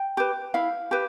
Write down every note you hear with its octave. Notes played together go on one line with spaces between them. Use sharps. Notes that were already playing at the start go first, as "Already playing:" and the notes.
Already playing: G5
G4 B4
E4 F5
G4 B4